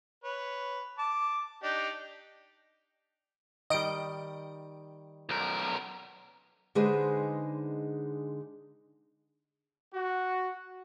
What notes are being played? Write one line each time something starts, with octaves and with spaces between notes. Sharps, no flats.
B4 C#5
A5 D6
D4 D#4 G4
D#3 G3 D#5 D7
B1 A#4
D3 G#3 D#4 G#4 B4 C5
F#4